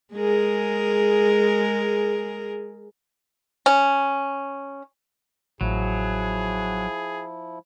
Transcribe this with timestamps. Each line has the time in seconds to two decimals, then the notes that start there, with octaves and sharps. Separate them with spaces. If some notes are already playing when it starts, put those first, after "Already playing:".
0.14 G#3 G#4 A#4
3.66 C#4
5.61 A1 F3 F#3 E4 G#4